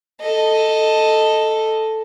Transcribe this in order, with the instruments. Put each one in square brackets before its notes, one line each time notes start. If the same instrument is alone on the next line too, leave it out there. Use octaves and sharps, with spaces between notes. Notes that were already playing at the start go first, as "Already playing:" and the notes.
[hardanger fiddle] A4 D#5